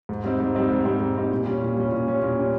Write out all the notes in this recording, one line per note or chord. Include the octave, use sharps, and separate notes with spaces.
G#2
G3 C4 D#4
G#2
G3 C4 D#4
G#2
G3 C4 D#4
G#2
G3 C4 D#4
A#2
G3 C#4
A#2
G3 C#4
A#2
G3 C#4
A#2
G3 C#4